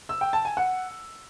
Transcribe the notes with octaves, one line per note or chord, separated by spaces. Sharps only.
E6
G5
A5
G#5
F#5